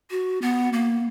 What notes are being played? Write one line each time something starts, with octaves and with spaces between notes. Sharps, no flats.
F#4
B3
A#3